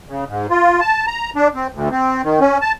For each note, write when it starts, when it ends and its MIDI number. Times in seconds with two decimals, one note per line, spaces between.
0.09 0.24 49
0.28 0.47 44
0.50 0.80 65
0.80 1.06 81
1.07 1.30 82
1.36 1.48 62
1.55 1.67 60
1.74 1.89 38
1.91 2.22 60
2.23 2.40 51
2.41 2.58 61
2.61 2.72 81